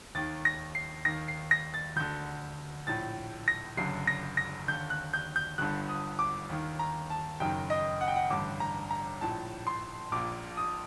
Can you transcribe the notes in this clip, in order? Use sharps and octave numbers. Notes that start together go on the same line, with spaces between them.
D#2 D#3 A6
A#6
C7
D#2 D#3 A#6
C7
A#6
A6
D2 D3 G6
A#1 A2 A6
A#6
F#1 F#2 D3 C7
A#6
A#6
D#2 D3 G6
F#6
G6
G6
G1 G2 D3 F#6
D#6
D6
D#2 D#3
A#5
A5
F#1 F#2 D#3 G5
D#5
F#5
G5
F#5
A1 G2 D3 D6
A#5
A#5
A#1 A2 A5
C6
A#1 A#2 D6
D#6